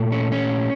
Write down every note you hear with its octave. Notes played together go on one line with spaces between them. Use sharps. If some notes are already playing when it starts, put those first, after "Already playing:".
Already playing: A#2 A3
C#4
C#4